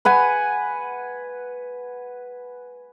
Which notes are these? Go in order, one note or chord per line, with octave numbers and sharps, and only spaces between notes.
B4 F#5 G#5